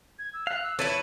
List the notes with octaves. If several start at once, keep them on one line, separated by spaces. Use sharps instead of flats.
G#6
E6
F5 F#6
E6
E2 E4 A4 B4 C#5 E5 D#7